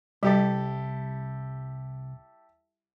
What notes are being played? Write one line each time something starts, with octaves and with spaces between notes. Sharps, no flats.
C2 G3 E4 G4 A4